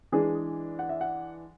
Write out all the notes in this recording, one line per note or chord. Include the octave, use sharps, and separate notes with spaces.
E3 G#3 D4 G#4
F#5
E5
F#5